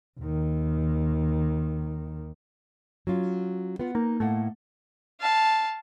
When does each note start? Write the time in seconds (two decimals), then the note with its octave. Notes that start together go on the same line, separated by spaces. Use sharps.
0.20 D#2 D#3
3.07 F#3 C#4 F4
3.79 B3 F4 F#5
3.95 A#3 D#4
4.20 A2 A3 A#3 F#5
5.20 F5 A5